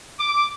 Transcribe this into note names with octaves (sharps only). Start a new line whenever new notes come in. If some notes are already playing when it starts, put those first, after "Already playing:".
D6